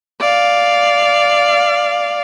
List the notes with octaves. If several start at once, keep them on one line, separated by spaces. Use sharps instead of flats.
D5 F5